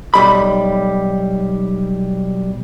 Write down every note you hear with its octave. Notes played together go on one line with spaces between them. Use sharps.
B1 G3 B5